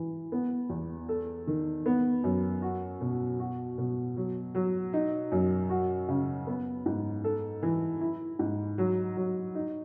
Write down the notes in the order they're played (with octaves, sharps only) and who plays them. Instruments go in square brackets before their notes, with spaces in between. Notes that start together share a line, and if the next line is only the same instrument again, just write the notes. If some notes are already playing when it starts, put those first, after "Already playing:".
Already playing: [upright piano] E3
B3
E2
A4
D#3
B3
F#2
F#4
B2
F#4
B2
F#3
F#3
D#4
F#2
F#4
C#3
B3
G#2
A4
E3
E4
G#2
F#3
F#3
D#4